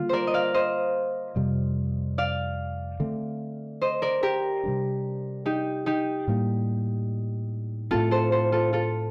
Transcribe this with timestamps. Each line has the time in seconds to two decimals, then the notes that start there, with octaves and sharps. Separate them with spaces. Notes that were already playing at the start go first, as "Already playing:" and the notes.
Already playing: D3 G3 A#3 F4
0.09 A#4 C5 D5
0.27 D#5
0.34 D5 F5
0.54 C5 D#5
1.36 F2 C3 G3
2.18 D5 F5
3.00 D3 A3 C4
3.82 C5 D#5
4.02 A#4 D5
4.23 G4 A#4
4.64 C3 G3 D4
5.46 D#4 G4
5.86 D#4 G4
6.28 A2 G3 A#3
7.91 A2 A3 C4 F4 A4
8.11 A4 C5
8.32 A4 C5
8.52 F4 A4
8.73 F4 A4